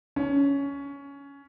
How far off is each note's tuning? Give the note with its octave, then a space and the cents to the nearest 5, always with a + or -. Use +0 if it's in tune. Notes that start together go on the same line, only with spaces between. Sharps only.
C#4 +15